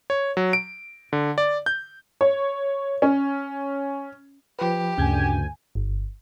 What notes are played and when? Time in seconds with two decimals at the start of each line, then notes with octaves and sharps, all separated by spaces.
0.10 C#5
0.37 F#3
0.53 D7
1.13 D3
1.38 D5
1.66 G6
2.21 C#5
3.02 C#4
4.59 F3 G4 B4
4.97 D2 G2 C#3 G#5 G6 G#6
5.75 G1